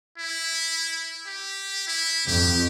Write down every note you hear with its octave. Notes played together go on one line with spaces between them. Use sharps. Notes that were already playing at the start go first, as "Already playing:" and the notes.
E4
G4
E4
F2 G4